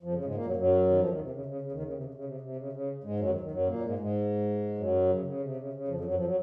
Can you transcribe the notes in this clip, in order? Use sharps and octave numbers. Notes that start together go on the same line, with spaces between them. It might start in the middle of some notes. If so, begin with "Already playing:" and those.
F2 F3
C#3
G#2 G#3
A#2 A#3
F#2 F#3
F#2 F#3
D#3
F2 F3
D#2 D#3
C3
C#3
C#3
C#3
D#2 D#3
C#3
C3
C#3
C#3
C3
C3
C#3
C#3
G#2 G#3
F#2 F#3
D#2 D#3
D#2 D#3
F#2 F#3
A#2 A#3
G#2 G#3
G#2 G#3
F#2 F#3
C#3
C#3
C3
C#3
C#3
F2 F3
F3
F#2 F#3
F2 F3
F#3